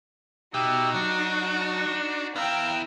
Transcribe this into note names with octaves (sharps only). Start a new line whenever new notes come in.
B2 D#4 F#4 G4 E5
F#3 D4 C#6
B3 E4 F5 G5 A#5